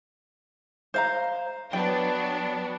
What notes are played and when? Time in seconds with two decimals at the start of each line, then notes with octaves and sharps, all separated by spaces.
0.94 C5 F5 A#5
1.73 F#3 B3 D4 G5